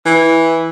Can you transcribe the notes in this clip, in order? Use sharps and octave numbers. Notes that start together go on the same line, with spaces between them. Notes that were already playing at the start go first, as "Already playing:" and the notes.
E3